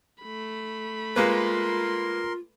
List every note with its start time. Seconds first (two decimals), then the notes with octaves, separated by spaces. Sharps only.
0.23 A3 B5
1.16 G#3 A#3 F4 A#4 B4 C6